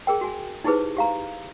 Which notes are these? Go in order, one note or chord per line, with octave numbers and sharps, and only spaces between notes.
G#4 A#4 G5
F#4 G#5
D#4 E4 G4 G#4 B4 C5
G4 F5 A#5